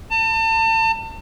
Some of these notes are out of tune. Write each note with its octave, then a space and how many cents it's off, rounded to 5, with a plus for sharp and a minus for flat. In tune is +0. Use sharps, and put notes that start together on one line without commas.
A5 +35